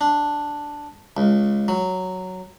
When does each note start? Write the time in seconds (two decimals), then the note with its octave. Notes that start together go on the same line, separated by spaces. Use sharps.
0.01 D4
1.17 C#2
1.68 F#3